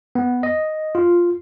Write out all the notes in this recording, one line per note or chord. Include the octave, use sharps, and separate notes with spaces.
B3
D#5
F4